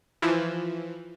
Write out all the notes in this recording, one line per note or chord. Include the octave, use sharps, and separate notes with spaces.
E3 F3